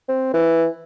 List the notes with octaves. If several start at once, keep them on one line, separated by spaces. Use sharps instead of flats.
C4
E3